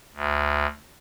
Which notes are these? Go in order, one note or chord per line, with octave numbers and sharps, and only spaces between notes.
D2